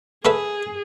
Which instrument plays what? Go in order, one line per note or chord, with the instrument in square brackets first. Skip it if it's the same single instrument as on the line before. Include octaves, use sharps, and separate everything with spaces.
[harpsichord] A3 B4 E5 [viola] G#4